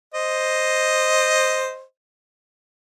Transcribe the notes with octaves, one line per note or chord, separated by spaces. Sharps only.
C5 D#5